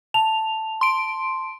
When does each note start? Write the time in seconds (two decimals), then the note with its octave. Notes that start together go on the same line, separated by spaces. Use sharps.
0.14 A5 F7
0.81 C6 D7